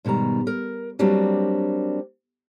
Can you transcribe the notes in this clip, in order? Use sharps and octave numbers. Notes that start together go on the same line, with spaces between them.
G#2 B2 D#3 G3 A#5
A#4
F#3 G3 A#3 C4 D4 F#4